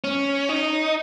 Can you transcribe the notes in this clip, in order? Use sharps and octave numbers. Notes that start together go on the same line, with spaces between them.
C#4
D#4